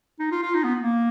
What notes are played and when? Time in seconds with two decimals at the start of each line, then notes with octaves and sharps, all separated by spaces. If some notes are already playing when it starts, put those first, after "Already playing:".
0.19 D#4
0.31 F4
0.43 F4
0.54 D#4
0.64 B3
0.82 A#3